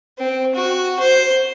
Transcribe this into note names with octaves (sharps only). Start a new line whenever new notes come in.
C4
F#4
C5